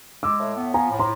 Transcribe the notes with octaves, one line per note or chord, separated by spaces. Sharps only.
G#3 D6 E6
A2
B3
F3 G#5 A#5
A2
A#5 C6